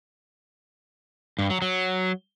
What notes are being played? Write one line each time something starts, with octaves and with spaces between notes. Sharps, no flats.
G2
F#3
F#3